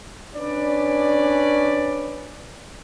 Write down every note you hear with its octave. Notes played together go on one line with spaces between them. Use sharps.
C#4 D4 B4 D5